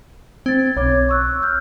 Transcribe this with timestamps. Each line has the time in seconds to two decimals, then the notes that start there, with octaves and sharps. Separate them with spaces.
0.46 C4 G#6 A6
0.77 B1 C#5 D6 G#6
1.09 C#6 E6 F#6
1.43 F6 G6